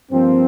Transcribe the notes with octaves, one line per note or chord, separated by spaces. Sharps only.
G2 F3 A#3 C4